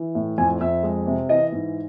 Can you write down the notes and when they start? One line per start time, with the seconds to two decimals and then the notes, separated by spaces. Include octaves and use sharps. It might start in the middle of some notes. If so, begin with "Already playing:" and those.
Already playing: E3
0.15 A2
0.38 F2 G#5
0.61 F2 E5
0.83 G#3
1.07 C3
1.29 E3 D#5
1.52 G#2